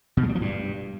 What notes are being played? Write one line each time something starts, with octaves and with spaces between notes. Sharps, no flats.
B2
G#3
G3
F3
G2